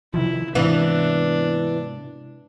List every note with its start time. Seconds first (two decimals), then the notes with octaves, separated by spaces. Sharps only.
0.14 C3 D#3 F3 E4
0.55 G#2 C3 E3 B3 D4